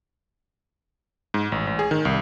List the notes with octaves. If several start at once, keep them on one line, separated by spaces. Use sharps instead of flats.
G#2
A1
A1
G#4
D#3
C2